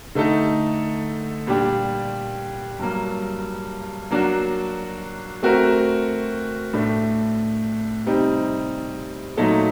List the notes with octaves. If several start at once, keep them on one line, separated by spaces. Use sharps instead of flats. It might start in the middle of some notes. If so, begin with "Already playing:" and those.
D3 A3 D#4 A4
A#2 G3 D4 G4
G2 F#3 A#3
F#3 A#3 D4 F#4
A3 C4 F#4 A#4
A2 A3 D4
C3 G3 C4 D#4
A#2 F#3 A3 D#4 A4